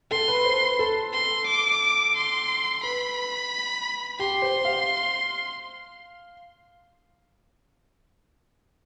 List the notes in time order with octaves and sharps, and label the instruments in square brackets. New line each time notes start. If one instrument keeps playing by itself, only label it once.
[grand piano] A4 [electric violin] C6
[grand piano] B4
C5
B4
A4
[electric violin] C6
D6
C6
[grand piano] B4 [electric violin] B5
[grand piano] G4 [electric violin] C6
[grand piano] C5
F5